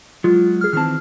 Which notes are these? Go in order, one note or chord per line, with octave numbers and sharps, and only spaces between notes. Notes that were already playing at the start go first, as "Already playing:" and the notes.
F#3 G#3 F4
G#4 F6
D#3 E3 C4 A5 F6